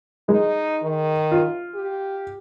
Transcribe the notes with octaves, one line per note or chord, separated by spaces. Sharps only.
G#3 D#4
D#3
F4
G4